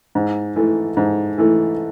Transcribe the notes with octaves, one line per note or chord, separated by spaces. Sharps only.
G#2
E3 A3
G#2
E3 A3